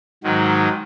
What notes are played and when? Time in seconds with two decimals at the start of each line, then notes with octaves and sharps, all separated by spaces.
0.24 G#2 D#3 F#3